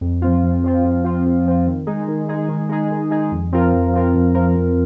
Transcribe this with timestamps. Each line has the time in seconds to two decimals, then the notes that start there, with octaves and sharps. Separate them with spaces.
0.01 F2
0.22 F3 C4 F4
0.43 F2
0.64 F3 C4 F4
0.84 F2
1.04 F3 C4 F4
1.26 F2
1.46 F3 C4 F4
1.67 D#3
1.87 G#3 D#4 G#4
2.08 D#3
2.29 G#3 D#4 G#4
2.48 D#3
2.69 G#3 D#4 G#4
2.91 D#3
3.11 G#3 D#4 G#4
3.31 F2
3.52 F3 C4 F4 A#4
3.73 F2
3.93 F3 C4 F4 A#4
4.14 F2
4.35 F3 C4 F4 A#4
4.55 F2